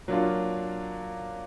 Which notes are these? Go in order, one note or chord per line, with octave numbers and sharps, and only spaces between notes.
F#3 A#3 D4 F4